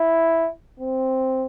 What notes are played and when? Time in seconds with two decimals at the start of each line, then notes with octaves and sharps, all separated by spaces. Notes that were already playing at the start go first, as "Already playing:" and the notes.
Already playing: E4
0.80 C4